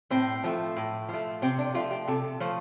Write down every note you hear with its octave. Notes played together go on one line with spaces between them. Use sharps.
A2 C4
F3 A3
A2
F3 A3
C3 C4
D4
F3 A3 F4
G4
C3 A4
F3 A3 C5